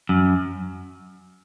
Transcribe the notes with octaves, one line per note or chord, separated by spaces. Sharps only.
F#2